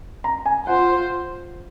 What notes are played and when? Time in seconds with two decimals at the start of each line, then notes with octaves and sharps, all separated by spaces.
0.24 A#5
0.46 G#5
0.67 F4 C5 F#5